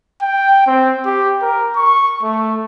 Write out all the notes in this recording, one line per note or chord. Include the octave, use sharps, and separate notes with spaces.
G5
C4
G4
A#4
C#6
A3